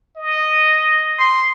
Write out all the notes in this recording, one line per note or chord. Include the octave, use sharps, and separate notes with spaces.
D#5
C6